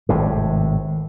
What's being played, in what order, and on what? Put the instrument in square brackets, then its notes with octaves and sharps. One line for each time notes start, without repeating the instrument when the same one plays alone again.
[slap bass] G#1 A2 C3